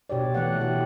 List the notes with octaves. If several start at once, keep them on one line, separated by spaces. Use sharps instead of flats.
B2 G4 C#5 D5
E3 A3 F#5
B2 E3 G4